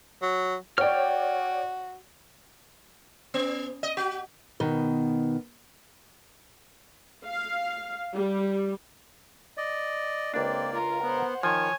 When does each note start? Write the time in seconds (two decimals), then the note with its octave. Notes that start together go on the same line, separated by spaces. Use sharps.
0.22 F#3
0.78 F#4 C#5 D5 G5 F6
3.34 B3
3.83 D#5
3.97 F#4
4.60 B2 D#3
7.25 F5
8.14 G3
9.57 D5 D#5
10.34 C#2 A#3 C4 D4 D5
10.74 F4 A#4
11.03 B3 C5 F#5
11.43 D#3 F3 C#5 G#5